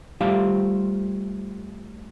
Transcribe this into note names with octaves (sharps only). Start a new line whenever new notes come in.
G3 A3 F4 G4 C5 F5